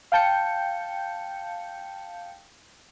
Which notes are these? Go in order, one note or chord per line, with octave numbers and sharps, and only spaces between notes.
F5 G5 A5 G6 C#7